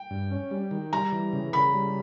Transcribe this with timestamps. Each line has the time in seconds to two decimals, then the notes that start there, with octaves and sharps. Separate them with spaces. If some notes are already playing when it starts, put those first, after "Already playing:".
Already playing: G5
0.10 G2
0.31 C#4
0.51 G3
0.71 D#3
0.93 G3 A#5
1.12 E3
1.33 C#3
1.53 C#3 B5
1.74 G3